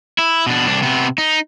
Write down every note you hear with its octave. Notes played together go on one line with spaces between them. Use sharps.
E4
B2 D4
C2 D4
C3 B3
D#4